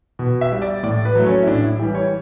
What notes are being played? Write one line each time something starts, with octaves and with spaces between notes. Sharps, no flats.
B2
E5
G3
D5
A2 D5
B4
F#3 A3
C#4
E4
A2 D4
E4
E3 G3 G4
C#5